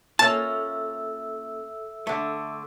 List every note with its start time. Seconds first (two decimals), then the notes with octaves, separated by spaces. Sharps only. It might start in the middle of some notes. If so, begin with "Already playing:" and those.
0.19 A#3 C#4 F4 A4 E5 A5 E6
2.07 D3 A3